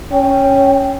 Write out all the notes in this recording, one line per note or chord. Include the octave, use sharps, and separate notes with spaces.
C#4 G5